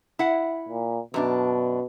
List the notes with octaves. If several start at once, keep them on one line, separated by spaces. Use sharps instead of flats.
E4 F#5
A#2
F#2 B2 D4 D5